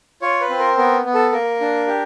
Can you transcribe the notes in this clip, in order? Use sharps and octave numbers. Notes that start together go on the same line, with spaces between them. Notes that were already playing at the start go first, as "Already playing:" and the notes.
F4 C#5
B4
C4
A#4
B3 A#4
B3
A4
A#3 A#4
D4
G4